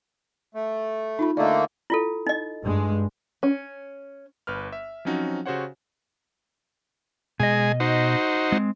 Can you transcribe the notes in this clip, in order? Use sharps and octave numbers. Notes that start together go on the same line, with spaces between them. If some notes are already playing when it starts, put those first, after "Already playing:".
A3
D#4 F4 B5
D3 A3 A#3 D5 D#5
E4 F4 A4
D#4 D#5
G2 G#3
C#4
G1 B4 F6
E5
F3 F#3 C4 C#4 D#4 F#4
C#3 F#4 G4 C5 C#5 F#5
B2 G#3 D#5 G#5
D#4 F#4 C5
G#3 C4